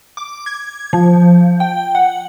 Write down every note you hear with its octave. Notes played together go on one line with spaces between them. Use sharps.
D6
G#6
F3
G5
F#5